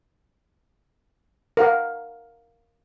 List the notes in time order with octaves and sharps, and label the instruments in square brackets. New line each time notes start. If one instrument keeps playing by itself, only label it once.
[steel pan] A#4 F5 F#5